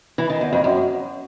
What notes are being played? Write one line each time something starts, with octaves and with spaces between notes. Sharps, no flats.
E3
D#3
E2
F2
F#2